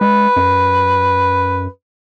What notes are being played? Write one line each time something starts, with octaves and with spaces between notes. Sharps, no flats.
G#3 B4
F#2